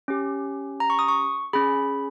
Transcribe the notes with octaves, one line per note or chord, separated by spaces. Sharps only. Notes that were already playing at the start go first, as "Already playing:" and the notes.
C#4 G4
A#5
C#6
D#6
C#6
C#4 G#4 B5